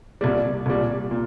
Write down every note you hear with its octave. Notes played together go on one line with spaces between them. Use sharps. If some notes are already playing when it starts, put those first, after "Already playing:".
C2 A#2 G3
C2 A#2 G3
A#2